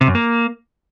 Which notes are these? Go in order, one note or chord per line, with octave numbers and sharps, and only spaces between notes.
C3
F#2
A#3